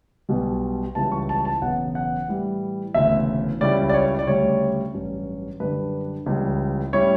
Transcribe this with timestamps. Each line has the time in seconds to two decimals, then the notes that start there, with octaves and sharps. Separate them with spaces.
0.29 B1 B2 G3
0.95 C#2 C#3 E3 G3 A5
1.12 C#6
1.29 A5
1.45 A5
1.61 E1 E2 C#3 F#3 B3 F#5
1.95 F#5
2.28 A2 E3 G3
2.94 E1 D2 C#3 E3 E5
3.61 C#2 C#3 G3 C#4 E4 D5
3.89 D5
3.94 C#5
4.19 D5
4.27 D2 C#3 G3 C#5
4.94 A1 G2 F#3 C#4
5.60 F#2 D3 G3 D4 B4
6.26 C#2 C#3 E3 G3
6.93 A2 G3 C#4 E4 C#5